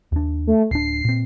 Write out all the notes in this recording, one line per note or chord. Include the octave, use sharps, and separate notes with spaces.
D#2 D4
A3
D1 D4 C7
A#2 C4